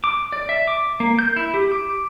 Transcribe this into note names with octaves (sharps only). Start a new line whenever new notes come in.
D6
D5
E5
D6
A#3
G6
E4
G4
D6